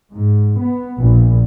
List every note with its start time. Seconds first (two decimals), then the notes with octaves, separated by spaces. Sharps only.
0.14 G#2
0.60 B3
1.00 A#1